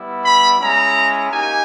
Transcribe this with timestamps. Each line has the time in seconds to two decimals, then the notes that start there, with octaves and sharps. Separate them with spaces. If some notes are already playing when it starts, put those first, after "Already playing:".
Already playing: G3 B3 E4
0.24 B5
0.59 G#3 C#4 E4 A#5
1.30 A#3 D#4 G4 G#5